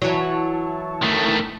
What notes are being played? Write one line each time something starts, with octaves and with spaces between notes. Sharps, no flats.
E3 F#3 E4 A5 C#6
D#3 A3